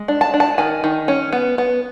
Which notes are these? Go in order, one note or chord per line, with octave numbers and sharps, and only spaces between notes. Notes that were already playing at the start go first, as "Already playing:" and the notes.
Already playing: G#3
D4
A5
D4
A5
D#3 G#5
D#3
C#4
B3
B3